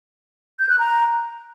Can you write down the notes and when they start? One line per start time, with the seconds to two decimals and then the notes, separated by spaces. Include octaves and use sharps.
0.59 G6
0.69 F#6
0.79 A#5